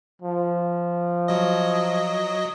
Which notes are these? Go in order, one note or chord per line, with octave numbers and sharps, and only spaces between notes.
F3
F#3 D#5